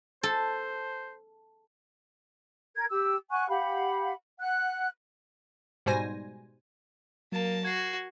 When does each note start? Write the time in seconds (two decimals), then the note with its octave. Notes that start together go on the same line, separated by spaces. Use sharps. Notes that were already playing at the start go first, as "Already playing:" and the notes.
0.23 A4 C5
2.76 A#4 G#6
2.90 G4 E6
3.31 F#5 G#5 C#6 F#6
3.49 G4 F5 F#5 B5
4.40 F#5 F#6
5.86 G#2 B2 G3 C5 G#5 A#6
7.32 F#3 A#3 A5
7.65 F#4 G#6 C7